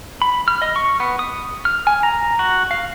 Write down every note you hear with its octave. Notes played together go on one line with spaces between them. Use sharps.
B5
F6
D#5
C#6
B3
D#6
F6
G#5
A#5
F#4
F5